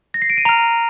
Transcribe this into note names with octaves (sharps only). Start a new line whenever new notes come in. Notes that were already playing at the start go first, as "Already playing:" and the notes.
A#6
C7
D7
D#7
A#5 F6 F7